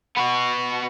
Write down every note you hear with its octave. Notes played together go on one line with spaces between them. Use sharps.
B3 F#4